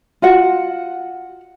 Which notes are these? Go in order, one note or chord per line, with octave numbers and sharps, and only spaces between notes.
F4 F#4 F#5